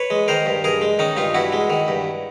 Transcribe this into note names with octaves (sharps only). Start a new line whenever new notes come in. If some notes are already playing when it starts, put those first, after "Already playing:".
Already playing: B4 C#5
G#3
D#3 A#4 C5
G2
G2 G#4 A#4
G#3
D#3 C#4 D#4
G2 D#4 F4
G2 E4 F#4
G#3
D#3
G2